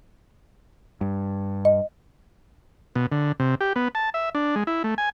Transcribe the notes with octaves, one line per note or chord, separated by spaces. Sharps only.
G2
D#5
B2
D3
C3
G4
B3
A5
E5
D4
G#3
E4
A3
G#5